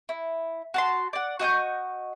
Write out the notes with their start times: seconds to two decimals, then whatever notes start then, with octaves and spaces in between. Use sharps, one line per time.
0.09 E4
0.74 F#4 A5 C6
1.13 D5 F#5
1.39 F#4 D#5 C#6 G6